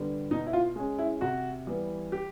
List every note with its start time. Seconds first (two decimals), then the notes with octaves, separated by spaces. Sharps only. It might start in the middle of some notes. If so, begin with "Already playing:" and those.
Already playing: D3 G3 B3
0.31 B2 D#4
0.47 E4
0.53 F4
0.76 G#3 C#4
0.99 E4
1.21 C3 F#4
1.67 E3 G3 B3
2.12 G4